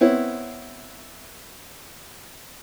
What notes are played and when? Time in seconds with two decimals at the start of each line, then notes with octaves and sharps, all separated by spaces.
0.01 B3 C4 E4 C#5